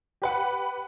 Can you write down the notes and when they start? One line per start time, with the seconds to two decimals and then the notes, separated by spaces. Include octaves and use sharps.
0.22 G4 B4 F#5